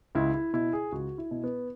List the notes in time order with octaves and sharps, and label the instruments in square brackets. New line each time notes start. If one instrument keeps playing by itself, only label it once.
[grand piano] C#2 E4
E4
B2 E4
G#4
C#2 F#4
E4
B2
B3